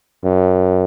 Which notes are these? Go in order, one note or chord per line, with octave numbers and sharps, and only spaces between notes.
F#2